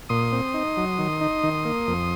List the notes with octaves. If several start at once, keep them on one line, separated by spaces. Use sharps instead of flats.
A#2 C6 D#6
C4
D#4
F#3
D#3
D#4
D#3
A#3
F2